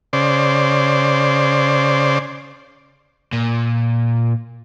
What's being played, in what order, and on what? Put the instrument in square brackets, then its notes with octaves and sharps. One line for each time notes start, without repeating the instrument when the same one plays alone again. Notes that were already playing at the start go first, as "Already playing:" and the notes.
[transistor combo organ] C#3 C5 D5
[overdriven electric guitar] A#2